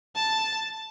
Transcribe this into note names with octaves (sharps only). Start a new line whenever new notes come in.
A5